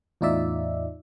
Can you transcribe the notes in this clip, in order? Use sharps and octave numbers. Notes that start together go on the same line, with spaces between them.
E2 A2 D#4 F4 D5 E5